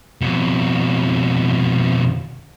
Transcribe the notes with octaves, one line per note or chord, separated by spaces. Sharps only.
F2 B2